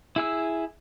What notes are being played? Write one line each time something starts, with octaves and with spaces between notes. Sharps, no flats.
E4 G#4 E6